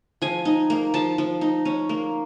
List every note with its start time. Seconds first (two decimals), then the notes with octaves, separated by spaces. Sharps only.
0.22 F3 G#5
0.45 D#4
0.70 A#3
0.94 F3 A5
1.18 F3
1.41 D#4
1.65 C#4
1.89 A#3